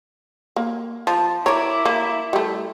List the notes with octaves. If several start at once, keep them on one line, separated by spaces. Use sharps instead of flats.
A#3
F3 A5
E4 A#4 C#5 D5
A#3
G3 A3